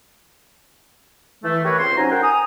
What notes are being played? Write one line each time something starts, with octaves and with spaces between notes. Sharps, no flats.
E3 A3
G4 A#4 B4 C#5
C#2 C4 C5 C6
C3 F#3 C#4 D#4 G#5 A#5
A#4 C5 F#5 G5
G#5 A#5 D#6